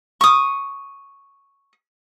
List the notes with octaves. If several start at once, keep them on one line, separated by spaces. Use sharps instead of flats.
C#6 D#6